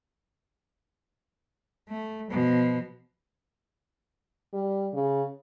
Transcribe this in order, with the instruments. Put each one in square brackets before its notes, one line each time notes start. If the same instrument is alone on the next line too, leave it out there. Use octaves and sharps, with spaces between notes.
[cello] A3
B2 F3
[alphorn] G3
C#3